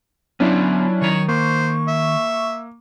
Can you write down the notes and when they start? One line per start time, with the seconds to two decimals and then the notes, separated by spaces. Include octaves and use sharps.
0.40 F#3 B3 C#4 D4 E4 F4
1.01 D#3 C#5 A#5
1.29 A#3 C5 C#6
1.88 E5